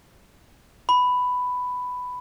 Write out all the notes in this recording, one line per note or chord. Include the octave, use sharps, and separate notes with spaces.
B5